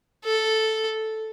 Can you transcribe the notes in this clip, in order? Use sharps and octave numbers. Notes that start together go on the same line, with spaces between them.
A4